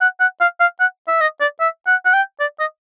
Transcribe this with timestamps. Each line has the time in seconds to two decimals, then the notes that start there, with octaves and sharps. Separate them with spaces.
0.01 F#5
0.20 F#5
0.41 F5
0.60 F5
0.80 F#5
1.08 E5
1.21 D#5
1.41 D5
1.60 E5
1.87 F#5
2.05 F#5
2.14 G5
2.40 D5
2.60 D#5